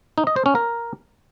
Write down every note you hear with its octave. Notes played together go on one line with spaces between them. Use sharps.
D#4
D#5
C5
C#4
A#4